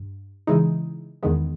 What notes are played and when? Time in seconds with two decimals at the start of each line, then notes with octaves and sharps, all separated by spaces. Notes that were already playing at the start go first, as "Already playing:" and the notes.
Already playing: G2
0.47 C#3 E3 G#3 D#4
1.23 E2 D#3 G#3 B3